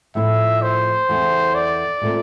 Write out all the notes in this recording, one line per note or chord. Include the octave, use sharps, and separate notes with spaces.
A2 F3 C4 E4 E5
C5
E2 E3 A3 C4
D5
A#2 A3 C4